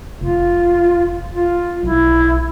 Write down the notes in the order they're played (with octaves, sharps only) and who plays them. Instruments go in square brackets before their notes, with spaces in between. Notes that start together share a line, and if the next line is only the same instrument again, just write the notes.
[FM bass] F1 [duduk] F4
[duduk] F4
[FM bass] B1 [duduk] E4